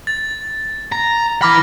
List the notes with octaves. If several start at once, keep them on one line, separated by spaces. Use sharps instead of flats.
A6
A#5
E3 B5 D6 F6 A#6